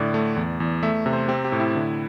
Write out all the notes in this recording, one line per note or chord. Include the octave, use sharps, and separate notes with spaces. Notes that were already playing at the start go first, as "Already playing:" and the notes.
Already playing: A2 D3 D5
A3
E2
E2
A3 E5
C3
C5
C4 G4
G4
A2
E4
D3